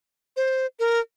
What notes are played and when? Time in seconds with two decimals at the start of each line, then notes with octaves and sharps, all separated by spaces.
0.37 C5
0.80 A#4